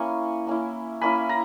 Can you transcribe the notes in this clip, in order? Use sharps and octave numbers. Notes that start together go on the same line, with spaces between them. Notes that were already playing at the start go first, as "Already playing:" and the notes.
Already playing: A#3 C#4 E4 G#5 C#6
A#3 C#4 E4
A#3 C#4 E4 G#5 B5
A#5